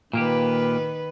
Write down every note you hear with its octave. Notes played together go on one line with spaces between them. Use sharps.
A#2 D#3 A#3 G4 B4